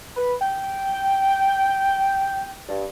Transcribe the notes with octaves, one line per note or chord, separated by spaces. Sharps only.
B4
G5
G2